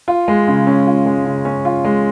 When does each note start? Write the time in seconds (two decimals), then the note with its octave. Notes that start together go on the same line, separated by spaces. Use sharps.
0.08 F4
0.28 G#3
0.48 C#3
0.67 C#4
0.87 F4
1.06 G#3
1.25 C#3
1.45 C#4
1.65 F4
1.84 G#3